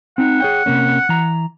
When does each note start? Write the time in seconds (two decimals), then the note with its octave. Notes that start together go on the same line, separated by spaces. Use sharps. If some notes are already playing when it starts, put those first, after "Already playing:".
0.18 C4 D#4 F#5
0.40 G#4 C#5 G5
0.66 C3 A#3 C#4
1.09 E3 A#5